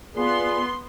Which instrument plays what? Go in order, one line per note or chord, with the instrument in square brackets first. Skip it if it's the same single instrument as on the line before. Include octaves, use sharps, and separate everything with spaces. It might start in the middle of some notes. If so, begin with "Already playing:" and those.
[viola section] B3 C6 [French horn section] F4 G#4 D5